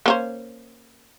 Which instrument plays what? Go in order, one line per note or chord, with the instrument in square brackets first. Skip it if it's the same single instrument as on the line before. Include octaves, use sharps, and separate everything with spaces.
[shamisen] A#3 C#4 C5